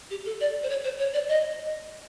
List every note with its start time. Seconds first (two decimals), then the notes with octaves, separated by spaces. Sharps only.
0.10 G4
0.25 A4
0.41 D5
0.63 C5
0.70 C#5
0.84 C5
0.99 C#5
1.14 D5
1.29 D#5